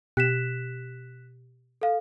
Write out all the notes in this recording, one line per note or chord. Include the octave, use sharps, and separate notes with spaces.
B2 G4 F#6 B6 E7
A4 F5